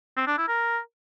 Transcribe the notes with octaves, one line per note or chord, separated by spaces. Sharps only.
C4
D4
E4
A#4